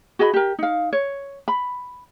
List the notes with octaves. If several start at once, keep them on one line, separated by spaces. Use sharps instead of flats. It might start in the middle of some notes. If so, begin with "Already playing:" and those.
F#4 G#4 D#5 B5
G4 A#4
D#4 F5
C#5
B5